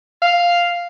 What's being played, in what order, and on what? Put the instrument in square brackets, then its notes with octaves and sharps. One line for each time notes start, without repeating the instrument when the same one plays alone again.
[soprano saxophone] F5